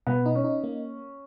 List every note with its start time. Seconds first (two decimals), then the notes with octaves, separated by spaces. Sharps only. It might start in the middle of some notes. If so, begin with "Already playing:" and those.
0.07 B2 B3
0.26 D#4
0.35 C#4
0.44 D#4
0.64 A#3